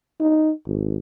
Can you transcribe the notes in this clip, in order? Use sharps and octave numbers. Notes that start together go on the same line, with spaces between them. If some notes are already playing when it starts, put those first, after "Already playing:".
D#4
G#1